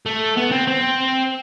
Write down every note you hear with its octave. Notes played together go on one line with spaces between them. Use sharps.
A3
B3
C4
C4